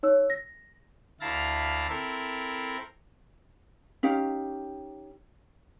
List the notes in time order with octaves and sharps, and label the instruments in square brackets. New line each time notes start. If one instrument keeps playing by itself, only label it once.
[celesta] D#4 C#5 E6
A#6
[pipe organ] D2 E4 F5 A5 A#5
C4 E4 A4 A#4
[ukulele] C#4 D#4 G4 F5